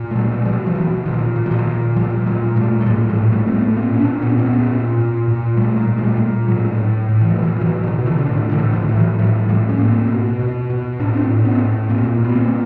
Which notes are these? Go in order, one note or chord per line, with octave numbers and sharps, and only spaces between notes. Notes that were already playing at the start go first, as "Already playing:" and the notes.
Already playing: A#2
A3
B2 F#3 G#3
G#3
B2 F3 G3
F3
B2 E3 F#3
A#2 D#3 F3
A#2
F#3
D#3 F3
A#2
A#2 F3 G3
A#2 F#3 G#3
A#2 G3 A3
A3
A2 F#3 G#3
F3 G3
A2
G3 A3
A2 C4
A3 B3
A#2 A#3 C4
C#4
C4 D4
A#2
B3 C#4
A#2 C4
B3 C#4
A#2
A#2
A#2
A#2 G3 A3
A#2
G#3
G3 A3
A#2
A2 F#3 G#3
A2
A2
E3
F3
B2 E3 F#3
E3 F#3
B2
D#3 F3
B2
D3 E3
D3
A2 D#3
D3 E3
A2
D#3 F3
A2
E3 F#3
A2 F3 G3
A2 F3 G3
C#4
A2 A#3 C4
B2
B2
B2
A2 D4
C4 D4
A2
B3 C#4
A2
A#2 A#3 C4
A#2 B3
A#3 C4
A#2